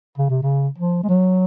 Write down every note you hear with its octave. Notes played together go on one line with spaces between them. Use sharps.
C#3
C3
C#3
F3
G#3
F#3